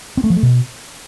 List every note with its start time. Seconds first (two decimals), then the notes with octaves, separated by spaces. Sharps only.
0.17 C4
0.24 A3
0.30 F3
0.36 A3
0.43 B2